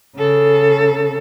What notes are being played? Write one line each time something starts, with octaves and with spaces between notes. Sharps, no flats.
C#3 A4